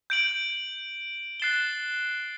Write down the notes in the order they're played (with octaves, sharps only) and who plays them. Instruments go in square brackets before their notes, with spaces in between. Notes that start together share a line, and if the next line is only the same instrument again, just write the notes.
[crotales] G6 D7 F#7
F#6 A6 C7 E7 G7